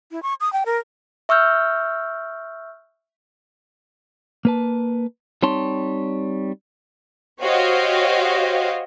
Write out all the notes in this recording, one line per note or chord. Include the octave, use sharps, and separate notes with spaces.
E4
C#6
D#6
G5
A#4
E5 C#6 E6 F6 G6
A#3 B4 A5
G3 C4 D#4 C#5 A5 C6
F#4 G4 C5 C#5 D#5 F5